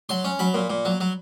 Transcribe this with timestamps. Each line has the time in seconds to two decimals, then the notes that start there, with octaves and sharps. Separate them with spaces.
0.09 F#3 C6
0.24 C#4
0.39 F#3 B5
0.54 A#2
0.70 A#2
0.85 F#3
1.00 F#3